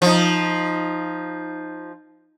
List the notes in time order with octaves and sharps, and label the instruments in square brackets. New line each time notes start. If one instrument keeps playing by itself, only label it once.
[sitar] F3 D#4